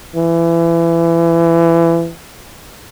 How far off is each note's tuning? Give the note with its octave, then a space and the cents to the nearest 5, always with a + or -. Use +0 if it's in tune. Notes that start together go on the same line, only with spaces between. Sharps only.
E3 +25